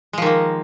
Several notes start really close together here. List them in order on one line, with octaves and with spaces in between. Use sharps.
G#3 F3 D#3 A#3